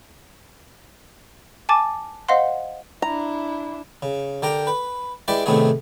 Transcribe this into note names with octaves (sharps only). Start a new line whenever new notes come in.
G#5 A5 D6 A6
C5 D#5 F5 F#5 C6
D4 E4 A#5
C#3
D3 G4 A#4 G5 A#5
B4
G#3 E4 G4 B4 D5 E5
A2 C3 D#3 A3 B3 G#4